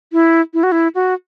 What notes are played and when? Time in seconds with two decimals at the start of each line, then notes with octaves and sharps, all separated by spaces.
0.13 E4
0.54 E4
0.63 F#4
0.72 E4
0.95 F#4